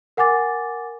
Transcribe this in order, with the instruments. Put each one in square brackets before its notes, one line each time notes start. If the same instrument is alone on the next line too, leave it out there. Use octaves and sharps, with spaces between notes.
[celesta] A#4 F#5 G#5 D6 A6